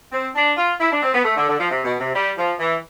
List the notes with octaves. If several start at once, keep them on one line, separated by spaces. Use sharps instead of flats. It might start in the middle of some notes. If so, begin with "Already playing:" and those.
C4
D4
F4
E4
D4
C4
B3
A3
D3
D3
F3
C3
B2
C3
G3
F3
E3